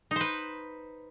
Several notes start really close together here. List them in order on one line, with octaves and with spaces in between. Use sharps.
D#4 C5 B4